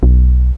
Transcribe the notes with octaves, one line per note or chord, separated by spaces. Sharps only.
B1